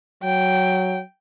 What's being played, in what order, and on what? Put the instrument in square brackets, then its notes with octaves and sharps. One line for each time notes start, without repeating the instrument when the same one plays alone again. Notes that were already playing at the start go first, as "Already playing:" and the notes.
[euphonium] F#3 [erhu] G5